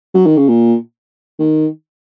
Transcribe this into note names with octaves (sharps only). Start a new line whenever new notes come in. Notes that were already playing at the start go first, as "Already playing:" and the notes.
F#3
D#3
C#3
A#2
D#3